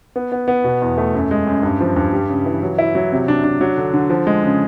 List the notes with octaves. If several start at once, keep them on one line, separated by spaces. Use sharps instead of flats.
B3
B3
B3
B2
E2
A3
F#2
G#3
F#2
G2
F3
G2
G3
C#3
E3
F#3
E4
F#3
C3
D4
D4
F#3
D3
D3
F3
G#3
C#3